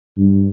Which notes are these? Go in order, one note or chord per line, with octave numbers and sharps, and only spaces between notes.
G2